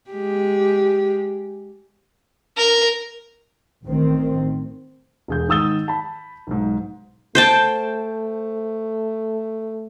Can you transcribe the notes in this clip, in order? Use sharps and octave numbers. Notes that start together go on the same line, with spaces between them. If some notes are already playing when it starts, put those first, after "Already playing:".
G#3 G4
A#4
A1 D#3 C4
E1 G#4 G6
G#2 D#3 D#6 E6 A6 G7
A5 B5
B1 G#2
A3 C5 G5 A5